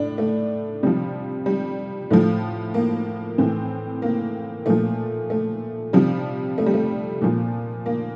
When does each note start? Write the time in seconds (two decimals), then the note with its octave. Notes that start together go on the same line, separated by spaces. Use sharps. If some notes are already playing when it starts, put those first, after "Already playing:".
Already playing: A2 D4
0.18 A3
0.83 C3 F3 G3
1.46 G3
2.11 A2 F3 A3
2.74 A#3
3.38 A2 E3 C4
4.02 A#3
4.66 A#2 F3 A3
5.30 A3
5.93 C3 F3 G3
6.58 A3
6.66 G3
6.74 A3
7.21 A#2 F3
7.86 A#3